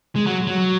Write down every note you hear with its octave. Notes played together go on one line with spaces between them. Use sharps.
G#3
F#3
F#3